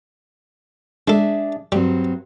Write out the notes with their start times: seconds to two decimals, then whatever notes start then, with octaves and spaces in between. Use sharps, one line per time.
1.08 G#3 D4 G#4 A4 E5
1.72 G2 F#3 G3 C4